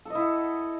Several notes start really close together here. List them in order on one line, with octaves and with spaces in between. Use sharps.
A4 D#5 E4 F#5